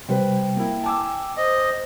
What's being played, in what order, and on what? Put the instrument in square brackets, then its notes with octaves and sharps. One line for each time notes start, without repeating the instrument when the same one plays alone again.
[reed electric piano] C3 G3 [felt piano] B4 C5 [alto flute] G5
[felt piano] A#3 E4
[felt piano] G#5 D6 E6 [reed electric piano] A5
[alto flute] C5 [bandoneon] D#5